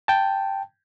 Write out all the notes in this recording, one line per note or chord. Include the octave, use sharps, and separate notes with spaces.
G5 A5